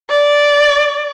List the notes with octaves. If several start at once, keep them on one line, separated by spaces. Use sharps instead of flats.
D5